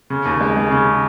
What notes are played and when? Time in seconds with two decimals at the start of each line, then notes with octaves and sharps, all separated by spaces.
0.10 C#3
0.25 D#2
0.41 G#3
0.56 G#3
0.71 C#3